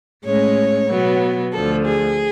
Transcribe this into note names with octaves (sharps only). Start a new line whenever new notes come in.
A2 G#3 C#4 C#5
B2 F#3 B3
D2 D3 F3 A4
G#4